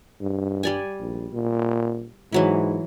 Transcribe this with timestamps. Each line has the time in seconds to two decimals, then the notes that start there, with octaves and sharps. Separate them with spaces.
0.20 G2
0.63 G3 D5 G#5
0.99 A#1
1.33 A#2
2.32 G#2 E3 F#3 E4